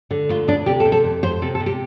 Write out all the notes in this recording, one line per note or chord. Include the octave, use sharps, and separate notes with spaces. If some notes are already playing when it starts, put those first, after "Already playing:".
D3
D2 F4
D2 D4
C3 G4
A4
C3
A4
F2
F2 C5
C3 A4
A4
C3
G4